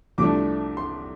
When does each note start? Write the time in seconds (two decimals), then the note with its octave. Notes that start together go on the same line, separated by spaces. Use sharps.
0.18 C2 C3 F3 A3 D4 D6
0.77 C6